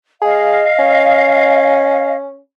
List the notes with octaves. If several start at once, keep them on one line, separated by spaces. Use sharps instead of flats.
G#4 D#5 F5
C#4